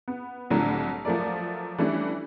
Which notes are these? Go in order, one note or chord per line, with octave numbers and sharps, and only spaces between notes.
B3
C2 A2 D3 F#3
F3 F#3 A3 A#4 D5
E3 G3 A3 C#4 D4 E4